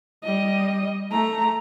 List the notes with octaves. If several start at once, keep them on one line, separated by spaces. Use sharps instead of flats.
G3 D#5
A3 A#5